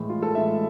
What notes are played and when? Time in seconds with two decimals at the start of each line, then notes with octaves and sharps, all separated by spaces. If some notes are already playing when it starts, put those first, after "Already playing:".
Already playing: A2 E3 G#3
0.09 F4
0.22 A4
0.35 A2 E3 G#3 E5